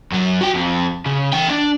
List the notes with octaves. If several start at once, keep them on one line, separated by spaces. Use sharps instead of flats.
F#2 F#3
F#4 G5
F2
C#3
E3 G5
D4